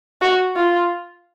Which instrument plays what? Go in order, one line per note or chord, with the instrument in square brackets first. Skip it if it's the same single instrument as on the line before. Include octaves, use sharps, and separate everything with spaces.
[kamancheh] F#4
F4